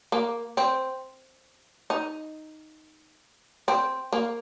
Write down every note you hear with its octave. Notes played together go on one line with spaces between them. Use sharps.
A#3
C4
D#4
C4
A#3